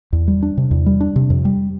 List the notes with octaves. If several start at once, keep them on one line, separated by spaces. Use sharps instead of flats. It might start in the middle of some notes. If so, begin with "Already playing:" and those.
E2
G3
D4
C3
E2
G3
D4
C3
F2
G3